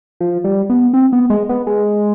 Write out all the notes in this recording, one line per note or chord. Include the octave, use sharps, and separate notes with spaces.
F3
G3
B3
C4
B3
G#3
B3
G#3